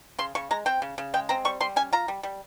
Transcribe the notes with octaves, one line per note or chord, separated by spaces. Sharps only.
C#3 C6
C#3 C#6
G#3 A#5
C4 G5
C#3
C#3
G#3 G5
C4 A#5
G3 C#6
G3 C6
C#4 G#5
F4 A#5
G3
G3